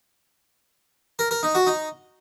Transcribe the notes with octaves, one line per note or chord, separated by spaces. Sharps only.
A#4
A#4
D#4
F#4
D#4